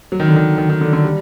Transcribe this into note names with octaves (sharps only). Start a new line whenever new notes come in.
F#3
D#3
D3
D#3
D#3
D#3
D3
D3
G3